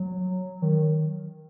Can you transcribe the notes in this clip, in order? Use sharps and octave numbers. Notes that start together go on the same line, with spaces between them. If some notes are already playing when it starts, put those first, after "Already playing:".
Already playing: F#3
D#3